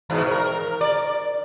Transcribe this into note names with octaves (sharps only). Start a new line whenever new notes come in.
E2 G#2 B2
A#4
D5